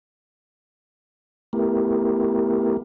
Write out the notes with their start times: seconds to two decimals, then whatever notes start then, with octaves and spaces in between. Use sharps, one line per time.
1.53 A3 B3 E4 G4 A#4